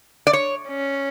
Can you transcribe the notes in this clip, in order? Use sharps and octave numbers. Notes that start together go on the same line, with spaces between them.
D5
C#5
C#4